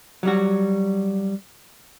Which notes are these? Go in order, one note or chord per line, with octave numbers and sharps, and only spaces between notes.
F#3 G3 F#4